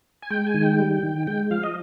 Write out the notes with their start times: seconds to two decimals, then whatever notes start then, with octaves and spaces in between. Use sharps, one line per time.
0.22 G#5
0.30 G#3 G5
0.47 G#5
0.54 D#3
0.62 G5
0.79 G3
1.03 D#3
1.27 G#3 G5
1.51 F3 F5
1.63 D#5